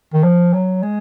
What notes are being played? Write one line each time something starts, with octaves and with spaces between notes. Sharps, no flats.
D#3
F3
F#3
G#3